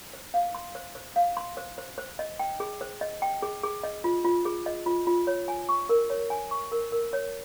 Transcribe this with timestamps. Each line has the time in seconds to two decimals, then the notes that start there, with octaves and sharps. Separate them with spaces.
0.13 C5
0.34 F5
0.55 C6
0.75 C5
0.95 C5
1.16 F5
1.37 C6
1.57 C5
1.78 C5
1.98 C5
2.19 D#5
2.39 G5
2.60 G#4
2.81 C5
3.01 D#5
3.22 G5
3.42 G#4
3.63 G#4
3.83 D#5
4.04 F4
4.25 F4
4.45 G#4
4.66 D#5
4.86 F4
5.07 F4
5.27 C#5
5.48 G#5
5.69 C#6
5.89 A#4
6.10 C#5
6.30 G#5
6.51 C#6
6.72 A#4
6.92 A#4
7.13 C#5